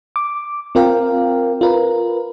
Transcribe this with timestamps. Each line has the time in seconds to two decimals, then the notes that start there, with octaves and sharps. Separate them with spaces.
0.16 D6
0.75 C4 F4 A#4 F5 G5
1.61 F4 A#4 B4